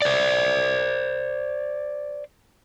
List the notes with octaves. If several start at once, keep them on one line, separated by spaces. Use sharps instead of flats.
C5 D5